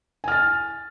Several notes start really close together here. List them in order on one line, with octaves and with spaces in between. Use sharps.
G#5 F6 A6